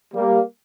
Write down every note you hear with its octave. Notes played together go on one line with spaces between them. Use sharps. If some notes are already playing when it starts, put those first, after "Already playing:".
G3 A#3